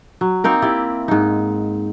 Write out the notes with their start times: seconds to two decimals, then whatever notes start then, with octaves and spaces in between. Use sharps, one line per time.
0.21 F#3
0.44 A#3 C4 D#4 A#4
0.62 E4 G4 D5
1.08 G#2 D#4